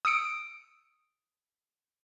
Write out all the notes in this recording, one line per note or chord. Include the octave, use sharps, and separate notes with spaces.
D#6 E6 C#7 D7